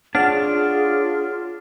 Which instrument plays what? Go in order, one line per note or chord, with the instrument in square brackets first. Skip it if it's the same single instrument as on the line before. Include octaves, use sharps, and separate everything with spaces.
[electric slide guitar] D4 [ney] F4 [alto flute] G#4 [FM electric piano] C#5 F#5 F6